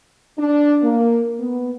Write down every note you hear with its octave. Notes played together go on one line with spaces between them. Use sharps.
D4
A#3
B3